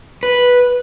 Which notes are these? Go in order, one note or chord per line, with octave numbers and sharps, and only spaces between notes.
B4